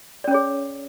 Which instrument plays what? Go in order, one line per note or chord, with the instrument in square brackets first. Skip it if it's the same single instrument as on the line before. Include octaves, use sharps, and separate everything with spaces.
[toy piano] D5
C#4
C#5
G#4